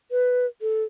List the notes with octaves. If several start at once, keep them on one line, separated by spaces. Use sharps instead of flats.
B4
A4